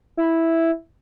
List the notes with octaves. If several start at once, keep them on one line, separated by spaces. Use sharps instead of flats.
E4